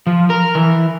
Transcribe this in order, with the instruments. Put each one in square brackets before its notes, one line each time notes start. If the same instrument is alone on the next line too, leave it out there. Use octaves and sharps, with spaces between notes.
[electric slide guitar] F3
A#4
E3